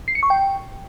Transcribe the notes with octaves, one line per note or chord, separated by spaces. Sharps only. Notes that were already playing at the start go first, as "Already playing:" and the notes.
C7
C#7
C#6
G5